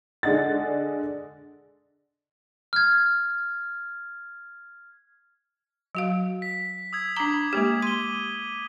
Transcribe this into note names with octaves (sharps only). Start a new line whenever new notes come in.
D3 G#3 D4 D#5 F#5 A6
F6 G#6
F#3 F#4 F5
B6
D#6 E6 G#6
D4 A#5 D6 F#7
G#3 A#3 G4
C6 D#7 G7